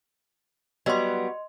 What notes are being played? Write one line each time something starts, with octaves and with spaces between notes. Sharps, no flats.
F#3 G3 B3 D#5 C6